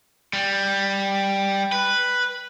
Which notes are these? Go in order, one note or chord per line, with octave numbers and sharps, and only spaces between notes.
G3
B4